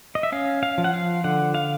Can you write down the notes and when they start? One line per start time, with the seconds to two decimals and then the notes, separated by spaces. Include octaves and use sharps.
0.15 D#5
0.23 E5
0.32 C#4 F5
0.63 F5
0.78 F3
0.84 F#5
0.94 F5
1.24 D3 F#5
1.55 F5